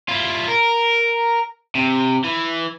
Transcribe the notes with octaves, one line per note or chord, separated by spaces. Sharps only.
E4 F4
A#4
C3
E3